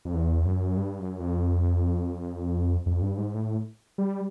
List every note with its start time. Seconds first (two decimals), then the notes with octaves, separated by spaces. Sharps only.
0.05 F2
0.14 E2
0.46 F#2
0.77 G2
0.99 F#2
1.20 F2
2.86 F2
3.02 G2
3.18 G#2
3.34 A2
3.98 G3